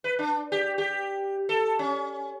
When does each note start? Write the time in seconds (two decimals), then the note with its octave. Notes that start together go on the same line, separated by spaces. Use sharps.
0.04 B4
0.19 D4
0.52 G4
0.78 G4
1.49 A4
1.79 C#4